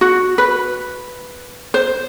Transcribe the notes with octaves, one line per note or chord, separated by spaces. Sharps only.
F#4
B4
C5